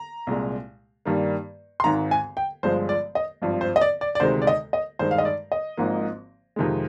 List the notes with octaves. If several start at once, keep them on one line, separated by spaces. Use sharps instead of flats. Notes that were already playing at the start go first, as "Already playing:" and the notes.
Already playing: A#5
C2 A#2 G#3
G2 D#3 G3 A#3
C6
G#1 G#2 D#3 A#5
G#5
G5
G1 G2 F3 G#3 C5
D5
D#5
G#1 G2 F3
C5
D#5
D5
D5
D5
D2 C3 D#3 G#3 C5
D5
D#5
D#5
G2 D#3 G#3 C5
F5
D#5
D5
D#5
G#1 G#2 F3 A#3
F2 C3 D#3 G#3